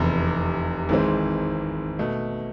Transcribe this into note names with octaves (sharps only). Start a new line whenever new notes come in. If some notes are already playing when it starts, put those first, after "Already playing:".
Already playing: F1 E2 C3
G#1 G#2 E3 G#3 C4
B2 A3